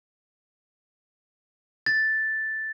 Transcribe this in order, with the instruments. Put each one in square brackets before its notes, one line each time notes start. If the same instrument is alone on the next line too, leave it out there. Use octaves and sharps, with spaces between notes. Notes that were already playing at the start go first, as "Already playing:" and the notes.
[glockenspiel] A6